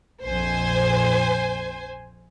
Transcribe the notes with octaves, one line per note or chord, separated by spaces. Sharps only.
A#1 F2 C5 G#5